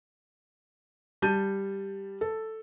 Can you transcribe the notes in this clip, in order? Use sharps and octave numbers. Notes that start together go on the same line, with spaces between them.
G3 A5 G6 D#7
A4